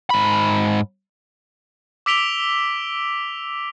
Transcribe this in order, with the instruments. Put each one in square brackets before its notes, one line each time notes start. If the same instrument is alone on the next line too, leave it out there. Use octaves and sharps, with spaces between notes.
[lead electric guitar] G#2 B5
[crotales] D6 E6 B6 D7 F7 G7